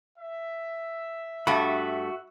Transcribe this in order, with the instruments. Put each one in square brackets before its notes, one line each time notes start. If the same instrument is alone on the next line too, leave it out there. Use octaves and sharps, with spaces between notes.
[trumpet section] E5
[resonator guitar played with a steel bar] G2 A3 [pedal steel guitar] F#4 [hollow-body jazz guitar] B5